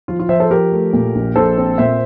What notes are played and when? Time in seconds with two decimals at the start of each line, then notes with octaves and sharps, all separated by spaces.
0.08 F3 F4
0.19 F4
0.29 F3 C5 E5
0.40 A4 C5
0.50 F3 G4 A#4
0.72 A3
0.93 A#2
1.15 A#1
1.36 A#1 A4 C5
1.58 C4
1.78 A#2 C5 E5